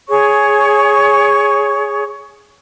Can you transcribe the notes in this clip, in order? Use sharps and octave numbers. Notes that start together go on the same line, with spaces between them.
G#4 C#5 C#6